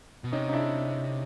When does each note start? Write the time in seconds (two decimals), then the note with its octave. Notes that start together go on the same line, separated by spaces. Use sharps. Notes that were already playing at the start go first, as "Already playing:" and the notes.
0.24 B2
0.32 C3 C#4 D#4
0.49 D#4
0.53 D4 E4